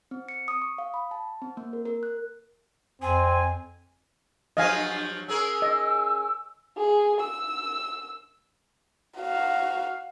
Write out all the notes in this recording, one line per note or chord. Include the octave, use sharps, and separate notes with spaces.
C4
C#7
D#6
C#6
F5
B5
A5
C4
A#3
A#4
A#4
F#6
F2 C4 G#5
G2 F3 F#3 D#5 F5 G#5
C#4 G#4 A#4 E6
D#5
G#4
E6
F#4 F5